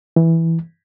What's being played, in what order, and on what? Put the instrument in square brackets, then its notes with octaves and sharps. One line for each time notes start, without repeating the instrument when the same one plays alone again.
[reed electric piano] E3